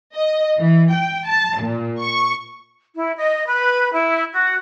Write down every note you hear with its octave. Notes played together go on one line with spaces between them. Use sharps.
D#5
E3
G5
A5
A#2
C#6
E4
D#5
B4
E4
F#4